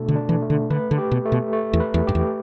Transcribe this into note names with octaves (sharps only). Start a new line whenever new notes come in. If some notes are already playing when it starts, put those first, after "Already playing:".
Already playing: B2 A3 D4 A4
D3
D4
E3
A3
D3
D3 B4
D3
G4
B2
A3
B2
A3
E2
B4
E2
G2 G4
E2